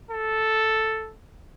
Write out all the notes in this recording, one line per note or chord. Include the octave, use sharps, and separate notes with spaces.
A4